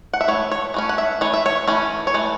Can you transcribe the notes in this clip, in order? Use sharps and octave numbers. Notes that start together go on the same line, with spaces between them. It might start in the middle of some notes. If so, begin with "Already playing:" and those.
F#5
E5
E3 A3 C#5
C#5
E3 A3 C#4
F#5
E5
E3 A3 C#5
E5
C#5
E3 A3 C#4
C#5
E3 A3